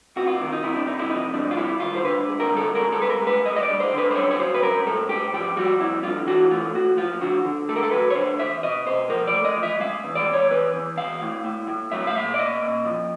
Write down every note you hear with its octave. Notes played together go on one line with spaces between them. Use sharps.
C3 F#4
F4
D#3
D#4
C3 E4
D4
C3 D#4
E4
F3 D#4
G#2 D4
F4
G3 E4
D#3 F4
C5
D3 B4
G#3
A#4
G2
A4
G#3 A#4
A4
G#3 B4
A#4
G#3
B4
G3 D#5
D#5
D5
G2
C5
D3
B4
C5
F#2 C#5
C#5
F#3 C5
B4
F#2 A#4
G#2 A4
G#2 G4
F3 G4
G3 F#4
F2 E4
D3 F4
E3 F#4
A3 F4
A2 F#4
F3 F4
D3 F#4
D3
A3 A4
A#4
A4
F#3 B4
C#5
D3 C5
E2 E5
B2 D#5
B2 C5
F3 A#4
D5
A3
D#5
F3
E5
G#3 F5
E2
D5
E2
C#5
E2 B4
E2
E2 F5
A2
A2
A2
F#3 E5
F5
A#2 E5
D5
A#2 D#5
A#2
F3